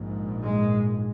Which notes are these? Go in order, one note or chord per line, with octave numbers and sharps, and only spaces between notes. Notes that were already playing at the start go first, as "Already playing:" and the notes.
Already playing: A#1 G#2
G#3